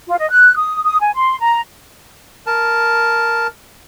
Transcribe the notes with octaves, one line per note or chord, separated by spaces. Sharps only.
F4
D#5
F#6
D#6
D#6
G#5
C6
A#5
A#4 A5